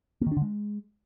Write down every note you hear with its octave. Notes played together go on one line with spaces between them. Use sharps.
A#3
D#3
D4
D3
G#3